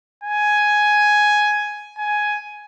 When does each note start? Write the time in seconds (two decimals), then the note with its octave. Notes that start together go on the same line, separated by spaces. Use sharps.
0.24 G#5
1.98 G#5